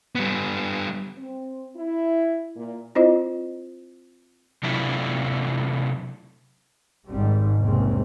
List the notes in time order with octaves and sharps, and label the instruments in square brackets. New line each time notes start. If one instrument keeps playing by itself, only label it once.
[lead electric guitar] G3 B3
[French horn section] C4
E4
A#2
[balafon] C4 E4 F4 C5 D#5
[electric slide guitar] C3 F#3 A3 D4 E4 F4
[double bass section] G#1 G#2 G3 C4
F1 A#1 E2 G#2 C#3 C4